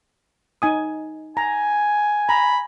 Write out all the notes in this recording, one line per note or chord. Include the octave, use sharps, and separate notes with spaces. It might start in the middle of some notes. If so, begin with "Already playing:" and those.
D#4 G#5 D#6
G#5 A#5
A#5 B5